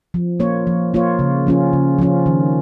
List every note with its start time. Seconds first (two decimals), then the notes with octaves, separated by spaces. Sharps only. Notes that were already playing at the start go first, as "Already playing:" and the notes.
0.14 F3
0.40 A#3 F4 C#5
0.67 F3
0.94 A#3 F4 C#5
1.19 C#3
1.47 F3 C#4 F4
1.73 C#3
1.98 F3 C#4 F4
2.26 D#3